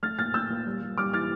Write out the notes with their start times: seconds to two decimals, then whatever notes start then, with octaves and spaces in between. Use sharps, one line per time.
0.03 A3 F6 A6
0.18 A#2 F6 A6
0.34 A3 E6 G6
0.50 A#2
0.66 G3
0.82 G3
0.98 G3 D6 F6
1.13 E3 F6 A6